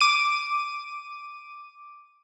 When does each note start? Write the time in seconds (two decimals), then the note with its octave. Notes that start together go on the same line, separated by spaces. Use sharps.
0.01 D6 D#7